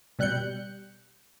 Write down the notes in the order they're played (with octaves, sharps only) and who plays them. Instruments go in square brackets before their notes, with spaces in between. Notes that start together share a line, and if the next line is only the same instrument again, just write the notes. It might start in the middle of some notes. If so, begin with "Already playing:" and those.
[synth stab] B2 G3 F#6 G6 C#7